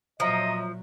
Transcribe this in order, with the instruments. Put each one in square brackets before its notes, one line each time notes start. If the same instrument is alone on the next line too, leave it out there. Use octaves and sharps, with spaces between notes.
[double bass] A#2 F#3 [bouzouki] F3 [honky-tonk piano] C#5 E5 A#5 [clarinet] D#5